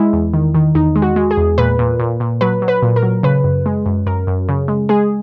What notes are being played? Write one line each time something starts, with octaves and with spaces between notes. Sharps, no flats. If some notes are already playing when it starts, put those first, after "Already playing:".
Already playing: G#3 E4
E2
D#3
D#3
E2 D#4
G#3
F#4
G#3
G#4
E2
A#2 B4
A#2
A#2
A#2
F#3 B4
F#3
B4
A#2
A#4
F#3
C#3 B4
F#2
G#3
F#2
F#2 A#4
F#2
C#3
G#3
G#3 G#4